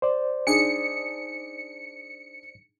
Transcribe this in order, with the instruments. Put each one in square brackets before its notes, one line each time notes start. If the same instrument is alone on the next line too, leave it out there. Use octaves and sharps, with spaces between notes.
[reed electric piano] C5 D5
[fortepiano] D4 D#4 G#4 [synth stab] C#7